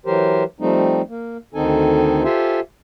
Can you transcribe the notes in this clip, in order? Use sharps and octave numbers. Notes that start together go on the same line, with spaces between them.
E3 F#3 G4 A#4 C5
F3 G3 A3 C4 D#4
A#3
D2 D#3 C4 D#4 A4 G#5
F4 G4 A4 C5 E5 G#5